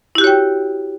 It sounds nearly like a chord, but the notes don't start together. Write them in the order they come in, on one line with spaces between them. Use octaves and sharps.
E4 G4 F#4 C#5 G5